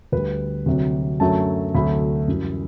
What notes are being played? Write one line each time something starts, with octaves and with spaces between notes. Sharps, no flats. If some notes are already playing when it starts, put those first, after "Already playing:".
D2 D3 G3 B4
D2 C3 F#3
F#2 D3 F#3 A3 A5
D2 C3 F#3 A3 B5
F#2 E3 G3